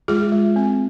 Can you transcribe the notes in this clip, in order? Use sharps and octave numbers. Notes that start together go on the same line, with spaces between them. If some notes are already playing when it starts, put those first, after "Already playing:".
G#3 F4 G#4
G#3
C4